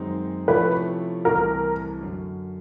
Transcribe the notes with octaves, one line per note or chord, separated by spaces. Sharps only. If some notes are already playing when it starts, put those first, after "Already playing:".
Already playing: F#2 D#3 G#3 C4 D#4
C3 F3 A3 C#4 E4 B4
C2 C3 E3 A3 A#4
F#2 D3 F#3